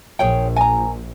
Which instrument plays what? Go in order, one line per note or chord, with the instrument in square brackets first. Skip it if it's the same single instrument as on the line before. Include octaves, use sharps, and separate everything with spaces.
[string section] A#1 [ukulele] G#4 C#5 G5
[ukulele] G#5 A#5